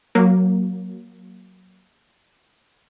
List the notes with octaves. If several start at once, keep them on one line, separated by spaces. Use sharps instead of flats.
F#3 A#3